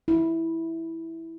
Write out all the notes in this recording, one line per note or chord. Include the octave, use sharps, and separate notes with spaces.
E4